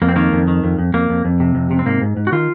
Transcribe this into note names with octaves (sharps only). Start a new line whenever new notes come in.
F2 A#3
C4
D#3 A#3
F2
D#3
F2
F2
F2 A#3
F2
F2
C3
F2
C3
C4
G#2 A#3
G#2
G#2
F#4
D#3 F4